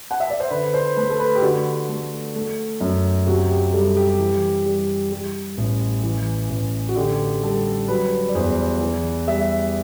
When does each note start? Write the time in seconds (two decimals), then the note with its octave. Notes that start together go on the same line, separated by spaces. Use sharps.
0.11 F#5
0.20 E5
0.30 D5
0.40 C5
0.51 D3 B4
0.74 C5
0.96 A3 B4
1.10 A4
1.19 B4
1.35 G4
1.42 D3 F#4
1.89 A3
2.35 A3
2.81 F#2
3.26 C3 F#4
3.50 G4
3.73 G3 A4
3.96 G4
4.19 E3
4.66 G3
5.12 G3
5.58 A1
6.03 E3
6.50 A1
6.89 F#4
6.96 D3 G4
7.43 G3 A4
7.88 F#3 B4
8.29 D5
8.35 E2 C5
8.81 E3
9.27 G3 E5